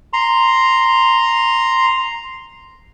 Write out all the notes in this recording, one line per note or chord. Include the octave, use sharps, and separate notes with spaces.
A#5 C6